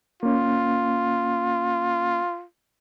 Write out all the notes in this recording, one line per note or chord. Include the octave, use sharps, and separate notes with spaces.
A#3 C#4 F4